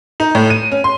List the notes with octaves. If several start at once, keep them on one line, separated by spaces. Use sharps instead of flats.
D#4
A2
D#7
C#4
C6